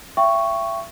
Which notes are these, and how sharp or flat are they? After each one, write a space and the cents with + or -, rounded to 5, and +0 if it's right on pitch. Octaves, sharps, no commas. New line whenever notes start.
E5 +35 G5 +0 C#6 +0